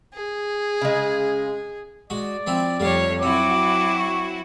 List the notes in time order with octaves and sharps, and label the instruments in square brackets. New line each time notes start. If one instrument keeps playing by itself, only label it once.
[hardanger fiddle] G#4
[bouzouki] C#3 G#3
[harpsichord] G#3 F#4 [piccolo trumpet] D5
[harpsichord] F3 C4 E4
[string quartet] F2 C#5 [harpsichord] G3 A3 F5
[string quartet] F#3 E4 F#4 [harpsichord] C4 [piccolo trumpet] D6
[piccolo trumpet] C#6